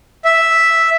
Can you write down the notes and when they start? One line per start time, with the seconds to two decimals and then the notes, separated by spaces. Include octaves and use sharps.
0.25 E5